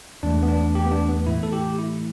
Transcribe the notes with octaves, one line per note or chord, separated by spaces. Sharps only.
E2 E3 A3 D4
B3
D4
G4
B3
D4
B3
A2 E3 A3 E4
A4
G4
E4